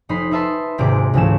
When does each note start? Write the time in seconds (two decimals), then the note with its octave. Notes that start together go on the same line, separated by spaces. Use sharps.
0.09 F1 D#4 C5 B5 C7
0.31 D#4 B4 E5 A5 B5 C6
0.78 D#1 G#1 C3 G#3 D5 D6
1.14 G#1 C#2 C#3 E3 A3 E7